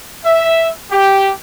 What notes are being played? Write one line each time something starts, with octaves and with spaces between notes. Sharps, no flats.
E5
G4